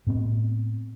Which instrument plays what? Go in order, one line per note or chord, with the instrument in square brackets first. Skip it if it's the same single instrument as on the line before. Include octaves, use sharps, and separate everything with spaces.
[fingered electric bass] A2 B3 C4